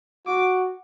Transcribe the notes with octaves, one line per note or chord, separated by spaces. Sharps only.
F#4 D6